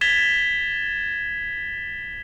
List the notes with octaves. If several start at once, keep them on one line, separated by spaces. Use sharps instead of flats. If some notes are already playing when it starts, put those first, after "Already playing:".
G#6 A6 B6 E7 F7 G7